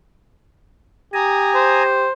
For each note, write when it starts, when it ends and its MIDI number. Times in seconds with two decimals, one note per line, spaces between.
1.14 2.08 67
1.14 1.83 80
1.14 1.83 82
1.14 1.83 87
1.55 2.11 72